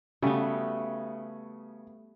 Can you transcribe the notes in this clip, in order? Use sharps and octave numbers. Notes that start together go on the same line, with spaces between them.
C#3 G3 A3 B3 F#4